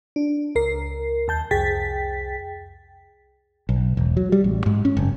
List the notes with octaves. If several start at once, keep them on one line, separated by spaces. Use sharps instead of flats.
D4
C#2 A#4 C7
D#2 A5 G6
C2 F2 G#4 G5 A6 B6
B1
E1
F#3
G3
A1
G#2
C#4
F#1